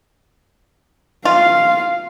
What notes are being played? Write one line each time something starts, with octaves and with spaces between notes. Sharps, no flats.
F4 F5